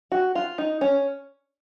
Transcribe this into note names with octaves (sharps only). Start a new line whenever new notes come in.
F#4
F4
D#4
C#4